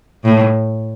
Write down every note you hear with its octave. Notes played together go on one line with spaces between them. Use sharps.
A2